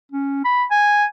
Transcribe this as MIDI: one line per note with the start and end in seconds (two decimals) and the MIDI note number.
0.12 0.41 61
0.45 0.64 83
0.71 1.05 80